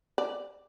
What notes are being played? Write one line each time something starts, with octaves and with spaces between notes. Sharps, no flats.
D5